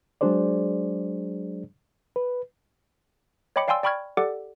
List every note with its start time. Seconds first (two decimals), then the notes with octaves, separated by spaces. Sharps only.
0.21 F#3 G#3 D4 G#4 C5 D5
2.16 B4
3.56 C#5 D#5 G5 B5 D6 C#7
3.68 D5 F5 G5 G#5 C6 E6
3.83 D5 G5 B5 C#6 F6 G#6
4.17 G4 A4 D5 F#5 D6